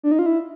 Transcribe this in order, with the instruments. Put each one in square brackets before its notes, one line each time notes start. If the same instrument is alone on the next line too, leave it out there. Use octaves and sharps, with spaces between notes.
[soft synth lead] D4
D#4
F4
E4